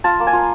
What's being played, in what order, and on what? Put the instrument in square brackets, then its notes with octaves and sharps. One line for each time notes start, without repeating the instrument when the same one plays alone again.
[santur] F4 A5
A#3
G#5
F4